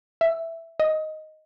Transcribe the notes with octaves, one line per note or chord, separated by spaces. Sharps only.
E5
D#5